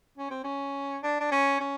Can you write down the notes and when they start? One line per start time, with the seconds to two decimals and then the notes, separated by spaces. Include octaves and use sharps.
0.18 C#4
0.30 C4
0.44 C#4
1.03 D4
1.20 D4
1.31 C#4
1.60 C#4